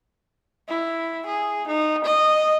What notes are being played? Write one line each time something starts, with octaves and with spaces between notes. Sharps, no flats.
E4
G#4
D#4
D#5